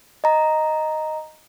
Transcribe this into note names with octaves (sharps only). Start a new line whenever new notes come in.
D#5 A#5